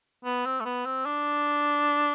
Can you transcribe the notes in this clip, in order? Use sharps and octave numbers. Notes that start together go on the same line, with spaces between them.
B3
C4
A3
B3
C4
D4